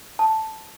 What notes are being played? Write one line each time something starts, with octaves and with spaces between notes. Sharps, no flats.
A5